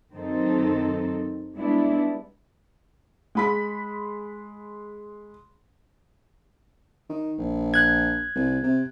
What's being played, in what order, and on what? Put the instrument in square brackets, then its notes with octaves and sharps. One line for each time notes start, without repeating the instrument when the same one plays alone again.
[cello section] F#2 D#3 C4 D#4 A4
G3 G#3 B3 D4 E4
[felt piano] G#3 B5 B6
[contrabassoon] D#3
A#1
[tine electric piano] F#6 G#6
[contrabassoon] C2
C3